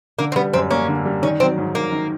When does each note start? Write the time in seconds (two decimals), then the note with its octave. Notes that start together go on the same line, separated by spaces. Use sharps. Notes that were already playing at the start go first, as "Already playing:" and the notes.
0.19 D3 A#3
0.32 C4
0.36 G3 B3
0.53 F#2 C4
0.71 A#3 C#4
0.88 D3
1.06 G3
1.22 D#3 C#4
1.40 F#3 C4
1.58 G#2
1.75 G#2 A#3
1.92 D#3